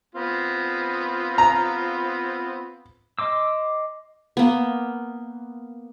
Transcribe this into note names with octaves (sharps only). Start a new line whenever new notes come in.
B3 C4 F4
A#5
D#5 C6 D6 E6
A#3 B3